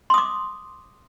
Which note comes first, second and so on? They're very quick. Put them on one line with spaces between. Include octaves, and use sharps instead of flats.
C6 D#6 D6